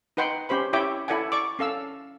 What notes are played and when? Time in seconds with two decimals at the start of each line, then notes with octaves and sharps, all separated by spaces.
0.17 D#4 B4 F#5 G5 C6
0.49 C#4 G4 C5 B5
0.73 E4 G4 C#5 E5 G5 D6
1.08 E4 A4 D5 F#5 G#5
1.32 D5 C#6 D6
1.59 C#4 A4 F5 E6